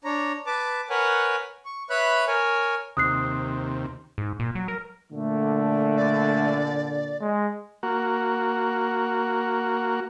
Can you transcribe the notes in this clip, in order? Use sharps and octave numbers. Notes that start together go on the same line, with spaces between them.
D4 C#5 A#5
B4 A5 D6
A#4 B4 C#5 F#5 G#5
C#6
B4 C#5 E5 B5 F#6
A#4 C#5 G#5
D#2 C3 D#6 F#6 C7
G#2
A#2
F#3
A#4
A#2 D3 A3
D5
G#3
A#3 F#4